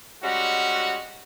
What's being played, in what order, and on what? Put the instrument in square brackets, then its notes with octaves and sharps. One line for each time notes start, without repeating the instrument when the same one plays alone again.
[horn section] G3 G#3 C#4 F#4